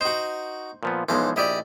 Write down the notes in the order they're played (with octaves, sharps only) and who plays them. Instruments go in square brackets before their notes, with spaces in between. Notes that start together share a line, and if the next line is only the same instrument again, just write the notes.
[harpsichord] D#4 F#4 [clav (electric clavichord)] C5
[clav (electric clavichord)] A#2 F3 B3
[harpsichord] B1 C5 [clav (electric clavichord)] E3 F3 G#3
[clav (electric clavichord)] A#1 E4 G4 [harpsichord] D5 D#5